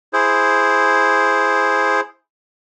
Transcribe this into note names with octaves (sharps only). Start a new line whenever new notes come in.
E4 G#4 C5